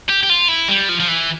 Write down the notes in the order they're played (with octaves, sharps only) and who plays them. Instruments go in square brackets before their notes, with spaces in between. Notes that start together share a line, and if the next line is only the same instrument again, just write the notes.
[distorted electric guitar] G4
G4
F4
E4
G3
F3
F3
E3